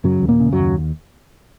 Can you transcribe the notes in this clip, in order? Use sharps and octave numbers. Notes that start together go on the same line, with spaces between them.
F#2 C#3 F#3
D#2
A#2 A#3
C#3
F#2 F#3
D#2